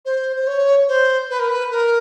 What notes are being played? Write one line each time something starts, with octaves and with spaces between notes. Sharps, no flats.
C5
C5
C#5
C5
B4
A#4
B4
A#4